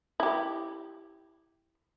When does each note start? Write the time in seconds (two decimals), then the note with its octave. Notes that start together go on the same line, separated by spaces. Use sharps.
0.20 E4 G4